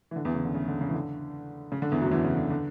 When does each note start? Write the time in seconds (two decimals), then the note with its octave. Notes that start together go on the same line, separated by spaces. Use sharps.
0.11 E3
0.16 D3
0.25 E2 E3
0.35 C#3
0.45 D3
0.55 C#3
0.68 D3
0.81 C#3
0.89 E3
0.93 D3
1.72 C#3
1.82 D3
1.92 E2 E3
2.01 F#2 F#3
2.11 E2 E3
2.25 C#3
2.37 D3
2.50 D3